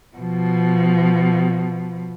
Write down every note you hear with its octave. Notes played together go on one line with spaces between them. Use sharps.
B2 F3